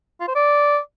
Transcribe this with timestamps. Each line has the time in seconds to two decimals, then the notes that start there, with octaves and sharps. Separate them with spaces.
0.21 F4
0.28 C5
0.35 D5